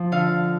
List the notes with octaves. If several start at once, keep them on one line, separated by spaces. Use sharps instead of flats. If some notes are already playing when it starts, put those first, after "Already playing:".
Already playing: F3
D3 F5